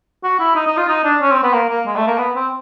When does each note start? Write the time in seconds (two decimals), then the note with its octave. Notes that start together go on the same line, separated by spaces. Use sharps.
0.24 F#4
0.40 E4
0.56 D#4
0.67 D#4
0.77 F4
0.88 D#4
1.04 D4
1.21 C#4
1.32 C4
1.43 B3
1.53 A#3
1.69 A#3
1.86 G#3
1.96 A3
2.08 A#3
2.18 B3
2.36 C4